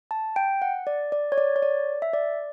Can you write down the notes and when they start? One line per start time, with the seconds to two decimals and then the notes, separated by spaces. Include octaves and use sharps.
0.11 A5
0.36 G5
0.62 F#5
0.87 D5
1.12 D5
1.32 C#5
1.38 D5
1.56 C#5
1.63 D5
2.02 E5
2.13 D5